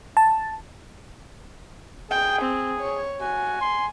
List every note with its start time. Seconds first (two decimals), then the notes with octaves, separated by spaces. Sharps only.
0.17 A5
2.11 G#4 G5
2.42 C4
2.80 C#5
3.20 F#4 G#5
3.61 C6